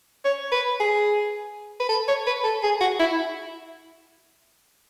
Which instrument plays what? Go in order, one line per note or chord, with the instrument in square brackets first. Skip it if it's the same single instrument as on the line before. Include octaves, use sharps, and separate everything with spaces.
[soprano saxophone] C#5
B4
G#4
B4
A4
C#5
B4
A4
G#4
F#4
E4